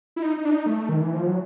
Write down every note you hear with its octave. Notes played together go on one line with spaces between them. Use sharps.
E4
D#4
D#4
D4
D#4
A3
D#3
E3
F3
F#3